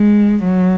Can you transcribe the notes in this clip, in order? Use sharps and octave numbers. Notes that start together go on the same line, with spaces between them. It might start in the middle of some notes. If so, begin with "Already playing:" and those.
Already playing: G#3
F#3